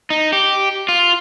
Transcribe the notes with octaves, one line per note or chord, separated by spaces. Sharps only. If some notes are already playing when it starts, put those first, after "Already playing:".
D#4
G4
F4